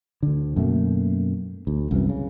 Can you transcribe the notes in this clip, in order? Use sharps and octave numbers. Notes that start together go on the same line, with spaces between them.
D2 D3
F#2 B2 A3 A#3
D2
C2 F#2 E3
C#3